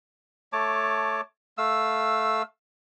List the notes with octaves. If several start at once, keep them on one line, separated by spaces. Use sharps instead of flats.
A3 C#5 A5 D6
A3 F5 E6